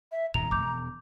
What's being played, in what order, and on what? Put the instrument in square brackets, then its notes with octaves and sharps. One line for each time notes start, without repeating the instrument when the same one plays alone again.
[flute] E5
[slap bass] D#1 G#2 B2 [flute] A#5 [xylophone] F7
[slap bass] E1 [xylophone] D6 G6